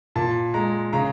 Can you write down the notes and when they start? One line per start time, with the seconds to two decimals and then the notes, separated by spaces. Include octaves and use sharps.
0.16 A#2 A5
0.54 G#3 A#5
0.93 C#3 A#5